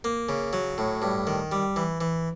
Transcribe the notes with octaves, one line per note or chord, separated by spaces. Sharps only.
A#3
C#3
F#3
A2
G2
D#3
G3
E3
E3